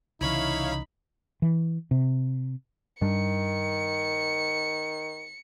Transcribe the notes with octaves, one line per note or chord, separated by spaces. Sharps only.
C2 C#3 E3 D#4 E4 C#5 F5 B5
E3
C3
G2 D#3 G3 D4 C#7